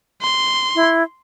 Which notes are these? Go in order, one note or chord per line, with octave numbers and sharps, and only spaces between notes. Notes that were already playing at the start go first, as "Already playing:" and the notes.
C6
E4